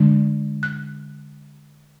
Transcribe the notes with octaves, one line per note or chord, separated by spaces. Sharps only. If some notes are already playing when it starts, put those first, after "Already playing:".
Already playing: D3 G#3 D4
F#6